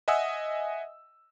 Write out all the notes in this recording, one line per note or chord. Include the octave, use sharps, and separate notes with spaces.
D#5 E5 F#5 G#5 D#6 E6